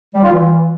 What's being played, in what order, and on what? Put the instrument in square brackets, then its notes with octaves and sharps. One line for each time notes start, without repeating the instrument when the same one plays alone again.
[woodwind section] G3
F4
E3